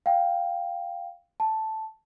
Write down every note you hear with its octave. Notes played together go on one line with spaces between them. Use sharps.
F5 G5
A5